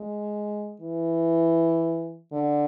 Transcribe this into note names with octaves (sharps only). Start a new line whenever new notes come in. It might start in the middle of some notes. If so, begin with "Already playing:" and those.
Already playing: G#3
E3
D3